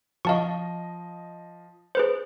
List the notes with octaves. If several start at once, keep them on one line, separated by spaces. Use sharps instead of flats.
F3 D#5 F5 A5 C#6
G#4 B4 C5